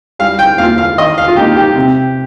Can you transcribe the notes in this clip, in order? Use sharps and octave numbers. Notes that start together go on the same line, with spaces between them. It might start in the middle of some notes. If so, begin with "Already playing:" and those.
G3 F5
G5
A#3 F4 F5
F5
D#3 D#5
F5
F4
A#3 D#4 G4
G4
C3